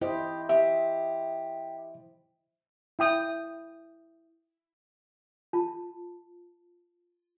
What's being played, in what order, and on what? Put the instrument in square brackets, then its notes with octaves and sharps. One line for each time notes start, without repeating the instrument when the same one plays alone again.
[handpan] E4 C5 D#5 [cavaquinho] G4
[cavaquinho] G4 [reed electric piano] E5
[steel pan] E4 G5 D#6
[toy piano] F4 A5